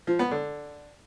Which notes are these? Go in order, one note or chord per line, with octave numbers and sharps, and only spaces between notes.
F3
B3
D3